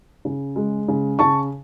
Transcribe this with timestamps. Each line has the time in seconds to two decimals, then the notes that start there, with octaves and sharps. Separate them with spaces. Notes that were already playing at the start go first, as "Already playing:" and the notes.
0.25 C#3
0.56 G#3
0.88 C#3
1.19 C#3 A5 C#6